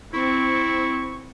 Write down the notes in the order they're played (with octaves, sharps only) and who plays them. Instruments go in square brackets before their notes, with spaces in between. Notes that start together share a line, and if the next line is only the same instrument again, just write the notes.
[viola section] C4 [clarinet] E4 [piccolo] C#6